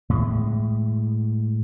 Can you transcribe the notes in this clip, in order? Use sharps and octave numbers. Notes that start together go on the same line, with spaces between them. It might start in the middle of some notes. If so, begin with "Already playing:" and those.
A2 G#3